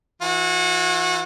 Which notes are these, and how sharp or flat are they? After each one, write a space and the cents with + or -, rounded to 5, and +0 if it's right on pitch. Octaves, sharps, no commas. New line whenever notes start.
E3 +5 F#4 -30